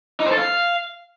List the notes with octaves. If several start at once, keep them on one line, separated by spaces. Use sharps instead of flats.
D#4
C5
A4
F5